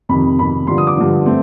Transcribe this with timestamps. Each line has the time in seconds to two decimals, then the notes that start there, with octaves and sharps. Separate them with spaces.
0.09 F2 C3 D#3 B5
0.39 F2 C3 D#3 B5
0.67 G2 D3 F3 C6
0.78 D#6
0.87 D6
0.97 G2 D3 F3
1.26 A3 C4